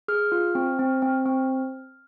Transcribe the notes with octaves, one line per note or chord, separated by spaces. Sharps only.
G#4 F6
F4
C4
C4
C4
C4